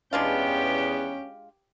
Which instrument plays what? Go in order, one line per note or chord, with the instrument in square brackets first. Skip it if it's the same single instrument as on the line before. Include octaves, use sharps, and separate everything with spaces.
[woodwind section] E2 B3 [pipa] G#3 D4 F4 [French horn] C#4 [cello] G4 G5